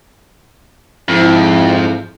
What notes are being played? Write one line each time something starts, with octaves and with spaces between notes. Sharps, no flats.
F2 G#2 E4